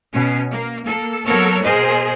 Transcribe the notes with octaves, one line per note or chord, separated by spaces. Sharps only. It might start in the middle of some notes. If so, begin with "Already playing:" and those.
B2 C#4
A#3
A#3 A4
F#3 A#3 B3 A4 A#4 C#5
B2 G#4 A#4 C5 D#5